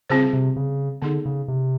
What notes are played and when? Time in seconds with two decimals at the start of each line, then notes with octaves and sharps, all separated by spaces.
0.10 C#3 G3 C4 F4 G#4 C5
0.33 C3
0.56 C#3
1.02 D3 B3 D#4 G#4
1.25 C#3
1.48 C3